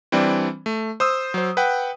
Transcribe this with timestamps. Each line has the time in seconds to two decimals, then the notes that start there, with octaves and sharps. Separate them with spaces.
0.12 E3 G3 C4 D4 D5
0.66 A3
1.00 C5 D#6 E6
1.34 F#3 C5
1.57 B4 F#5 G5